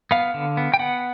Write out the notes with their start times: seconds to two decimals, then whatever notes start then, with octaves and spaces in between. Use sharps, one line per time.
0.11 B3 F5
0.34 D3
0.57 B3
0.74 G5
0.79 B3 F#5